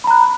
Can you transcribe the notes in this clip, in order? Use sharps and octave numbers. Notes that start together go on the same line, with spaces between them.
A#5 B5 F#6